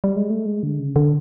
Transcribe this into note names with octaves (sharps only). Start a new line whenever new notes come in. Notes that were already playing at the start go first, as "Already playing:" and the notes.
G3
G#3
A3
G#3
D3
C#3
D3